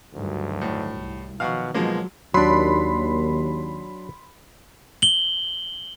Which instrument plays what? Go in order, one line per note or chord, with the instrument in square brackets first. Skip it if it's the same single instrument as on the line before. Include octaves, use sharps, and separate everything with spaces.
[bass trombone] D2 [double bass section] G2 D#3 F#3
[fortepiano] A2
[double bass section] C2
[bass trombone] B2 [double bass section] D#3 F3 F#3 [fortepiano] F5 F#5 C#6
[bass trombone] B2 [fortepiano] F3 G#3 A#3 [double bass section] F#3
[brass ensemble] D#2 [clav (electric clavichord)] F#3 D4 [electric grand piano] B5 C6
[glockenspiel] F#7 G7